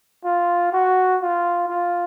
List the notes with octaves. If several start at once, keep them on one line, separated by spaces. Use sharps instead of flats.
F4
F#4
F4
F4